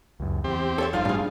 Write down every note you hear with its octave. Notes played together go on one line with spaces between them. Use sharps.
C#2 F#2
E2 C4 G4
A4 C#5 E5
G1 F3 G3 D#4 F4 F5
G1 A2 G3 D4 G#4